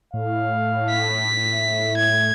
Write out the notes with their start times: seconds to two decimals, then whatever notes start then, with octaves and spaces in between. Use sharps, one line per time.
0.14 A2 F5
0.90 B6
1.53 E5
1.97 G#6